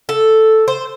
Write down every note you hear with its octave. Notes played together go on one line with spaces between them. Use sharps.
A4
C5